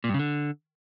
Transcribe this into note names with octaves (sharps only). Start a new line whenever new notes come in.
A#2
G2
C#3
D3